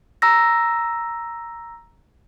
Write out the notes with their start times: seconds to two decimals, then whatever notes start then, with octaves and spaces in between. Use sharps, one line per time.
0.22 A#5 E6 A#6